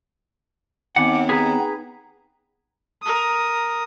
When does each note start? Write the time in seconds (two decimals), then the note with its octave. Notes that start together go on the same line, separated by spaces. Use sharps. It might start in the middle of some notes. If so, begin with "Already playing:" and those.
0.96 D#2 B3 C4 F#5 G#5 D6
1.29 G#4 B4 A#5
3.02 A#4 D#6